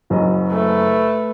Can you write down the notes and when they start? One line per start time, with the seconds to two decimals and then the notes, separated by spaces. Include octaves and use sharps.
0.10 F#1 F#2 D#5
0.48 A3 B4